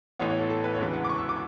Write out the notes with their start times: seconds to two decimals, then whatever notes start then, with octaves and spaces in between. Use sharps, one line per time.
0.19 A1 A2 E3 B3 C#5
0.30 C#5
0.39 A4
0.50 A4
0.64 B4
0.74 C#5
0.79 E1 D2 C#3 E3 B4
0.93 F#5
1.05 D6
1.09 C#6
1.18 E6
1.29 D6